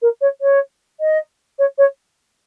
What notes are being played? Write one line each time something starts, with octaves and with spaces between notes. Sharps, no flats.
A#4
C#5
C#5
D#5
C#5
C#5